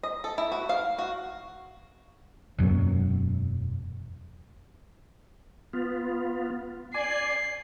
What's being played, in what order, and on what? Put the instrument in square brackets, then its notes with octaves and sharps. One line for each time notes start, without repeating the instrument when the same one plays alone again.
[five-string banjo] D#5
A4
E4
F#4
F5
F#4
[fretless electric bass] E1 F#2 F#3 A#3
[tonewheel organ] B3 F4
[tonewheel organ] D5 G#5 [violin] C7